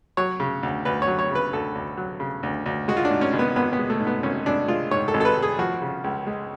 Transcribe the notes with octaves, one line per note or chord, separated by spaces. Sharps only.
F#3 C#5
C#3
D2
D2 B4
C#5
F#3
C#5
C#3 B4
D2 A4
D2
F#3
C#3
D2
D2
G#3 F#4
F4
D4
G#2
C#4
G#1
B3
G#1 B3
B3
G#3
A3
G#2
B3
G#1 C#4
G#1 D4
G#3 F4
G#2 C#5
A4
G#1
A4
B4
G#1
G#4
F3 F#4
C#3
C#2
G#3